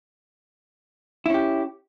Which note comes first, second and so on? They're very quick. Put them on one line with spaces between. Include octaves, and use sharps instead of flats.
E4 C#4 G4